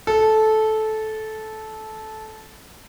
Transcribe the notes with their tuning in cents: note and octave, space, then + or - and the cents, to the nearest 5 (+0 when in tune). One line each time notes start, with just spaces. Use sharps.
A4 -15